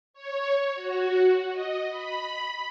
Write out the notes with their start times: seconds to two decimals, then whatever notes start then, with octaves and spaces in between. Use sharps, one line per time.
0.14 C#5
0.75 F#4
1.51 D#5
1.90 B5